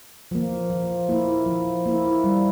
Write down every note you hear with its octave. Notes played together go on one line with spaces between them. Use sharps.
F3 A#3
F3
A#3 E4
F3
A#3 E4
G3